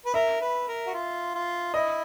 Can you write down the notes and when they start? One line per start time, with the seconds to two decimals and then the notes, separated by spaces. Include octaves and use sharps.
0.05 B4
0.14 A#4 E5
0.41 B4
0.68 A#4
0.87 F#4
0.94 F4
1.35 F4
1.74 E4 D#5